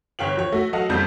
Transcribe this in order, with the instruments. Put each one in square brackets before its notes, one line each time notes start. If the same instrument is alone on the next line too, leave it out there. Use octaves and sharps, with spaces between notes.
[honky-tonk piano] G1 C#5 F5 G5 F#7
F3 C#5
A3 F#4
F#3 A4 D#5 F5 F#5
F#1 F2 G3 G6